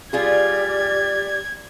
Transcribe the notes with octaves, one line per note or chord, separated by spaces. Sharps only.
G3 F4 G4 G#4 D5 G#6